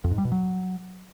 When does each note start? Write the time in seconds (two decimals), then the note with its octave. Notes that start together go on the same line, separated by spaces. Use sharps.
0.04 F2
0.11 G#2
0.18 G3
0.25 B2
0.32 F#3